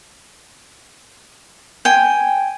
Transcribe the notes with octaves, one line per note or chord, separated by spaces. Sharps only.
G5 G#5